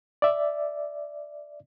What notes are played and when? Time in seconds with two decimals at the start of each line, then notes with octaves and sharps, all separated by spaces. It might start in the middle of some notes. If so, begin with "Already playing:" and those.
0.22 D5 E5